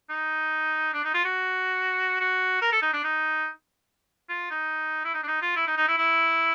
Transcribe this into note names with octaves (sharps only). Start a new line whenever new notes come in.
D#4
D4
D#4
F4
F#4
F#4
A#4
A4
D#4
D4
D#4
F4
D#4
E4
D#4
D4
D#4
F4
E4
D#4
D#4
E4
E4